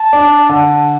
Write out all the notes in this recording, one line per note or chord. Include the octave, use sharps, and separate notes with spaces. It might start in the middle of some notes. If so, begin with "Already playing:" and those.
Already playing: A5
D4
D3 A5